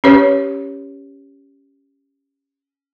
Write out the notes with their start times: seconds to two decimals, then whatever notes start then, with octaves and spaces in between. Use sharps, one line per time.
0.04 C#4 G4 B4 C#5